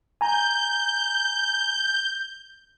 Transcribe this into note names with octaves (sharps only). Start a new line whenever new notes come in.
G#5 A#5 G6